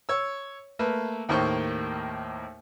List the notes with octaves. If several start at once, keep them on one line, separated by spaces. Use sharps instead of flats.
C#5 E6
A3 A#3 B4
D#2 A2 D#3 A#3 C5 C#6